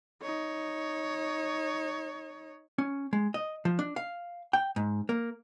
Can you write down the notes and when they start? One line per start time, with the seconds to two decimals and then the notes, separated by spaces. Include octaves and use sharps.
0.22 D#4 C#5
2.78 C#4
3.13 G#3
3.34 D#5
3.65 F3
3.79 D4
3.96 F5
4.53 G5
4.76 G#2
5.09 A#3